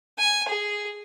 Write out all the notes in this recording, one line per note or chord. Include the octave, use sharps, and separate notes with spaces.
G#5
G#4